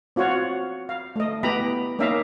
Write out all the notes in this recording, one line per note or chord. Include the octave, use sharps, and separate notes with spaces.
C4 F4 F#4 C#5 F#5
F5
A3 D#5
B3 E4 G4 D#5 A#5 B5
A#3 C#4 D#4 E5 F5 A#5